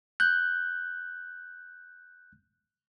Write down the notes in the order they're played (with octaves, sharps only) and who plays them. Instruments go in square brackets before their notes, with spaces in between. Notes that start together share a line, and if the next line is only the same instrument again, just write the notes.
[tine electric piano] F#6 G6